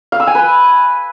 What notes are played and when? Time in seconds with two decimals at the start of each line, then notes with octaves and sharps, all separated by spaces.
0.12 F5
0.20 E6
0.27 G#5
0.35 B4